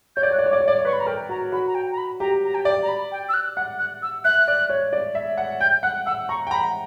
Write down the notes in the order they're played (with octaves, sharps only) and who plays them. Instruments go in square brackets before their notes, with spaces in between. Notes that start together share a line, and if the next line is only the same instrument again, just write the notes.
[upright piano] C#5 [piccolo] G6
[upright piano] D5
[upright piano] C#5 [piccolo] F#6
[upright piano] D5
C#5
[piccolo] D6
[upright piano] D5
C#5
[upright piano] D5 [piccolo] D6
[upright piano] C#5
[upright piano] B4 [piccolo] C#6
[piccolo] B5
A#5
[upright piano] A#4 [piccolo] G5
[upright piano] F#4 [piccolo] A#5
[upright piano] F#4 [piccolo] B5
[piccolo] A#5
G5
A#5
B5
[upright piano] G4 [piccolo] A#5
[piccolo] A#5
G5
[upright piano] D5
[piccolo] A#5
B5
G5
E6
F#6
[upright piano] F#5 [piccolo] F#6
[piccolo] F#6
E6
[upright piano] E5 [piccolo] F#6
[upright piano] D5
C#5
D5
E5
F#5
[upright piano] G5 [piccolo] G6
[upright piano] F#5 [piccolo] F#6
[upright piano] F#5 [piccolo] E6
[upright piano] A#5 [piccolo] C#6
[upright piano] G5
[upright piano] A#5 [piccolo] B5